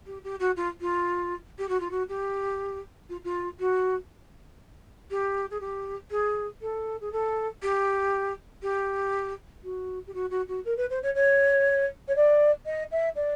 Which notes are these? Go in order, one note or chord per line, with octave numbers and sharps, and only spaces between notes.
G4
G4
F#4
F4
F4
G4
F#4
F4
F#4
G4
F4
F4
F#4
G4
G#4
G4
G#4
A4
G#4
A4
G4
G4
F#4
G4
F#4
F#4
F#4
A#4
B4
C5
C#5
C#5
C#5
D5
D#5
E5
D5